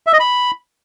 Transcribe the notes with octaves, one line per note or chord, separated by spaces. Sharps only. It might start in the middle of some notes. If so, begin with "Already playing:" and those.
E5
D#5
B5